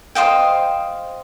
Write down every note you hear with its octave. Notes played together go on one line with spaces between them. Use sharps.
C5 D#5 F5 G5